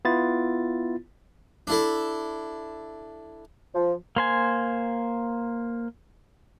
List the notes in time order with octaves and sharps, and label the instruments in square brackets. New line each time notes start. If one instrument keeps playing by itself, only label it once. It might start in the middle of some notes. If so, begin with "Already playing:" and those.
[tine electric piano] B3 E4 F4 A6
[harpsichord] D4 E4 A4
[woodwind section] F3
[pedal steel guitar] A#3 C5 G#5